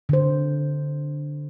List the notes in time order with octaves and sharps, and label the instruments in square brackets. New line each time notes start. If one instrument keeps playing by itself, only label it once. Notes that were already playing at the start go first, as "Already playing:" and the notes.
[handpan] D3 C5